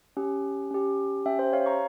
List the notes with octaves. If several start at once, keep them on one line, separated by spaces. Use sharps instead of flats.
C#4 G4
C#4 G4
C#4 G4 E5 G5
C5 E5
C#5 F5
A#5 C#6